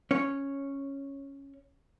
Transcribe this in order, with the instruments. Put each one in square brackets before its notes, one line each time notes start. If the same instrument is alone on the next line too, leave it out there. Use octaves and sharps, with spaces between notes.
[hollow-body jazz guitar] C#4 C#5